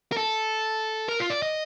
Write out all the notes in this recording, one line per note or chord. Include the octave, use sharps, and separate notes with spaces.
A#4
A4
A#4
F4
D5
D#5